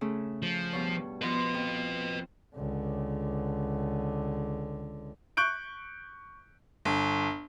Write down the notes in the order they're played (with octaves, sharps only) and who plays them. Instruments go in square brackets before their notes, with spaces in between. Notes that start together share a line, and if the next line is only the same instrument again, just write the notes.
[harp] C#3 A3 C#4
[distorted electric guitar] F3
[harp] G2 B2 C#5
[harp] F3 B3 C5 [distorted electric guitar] B4 D#5
[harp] F2
[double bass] C#2 D3
[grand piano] C#6 F#6 G6 D7
[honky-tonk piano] G1